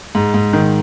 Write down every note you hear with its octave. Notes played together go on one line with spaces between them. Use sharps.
G#2
G#2
D#3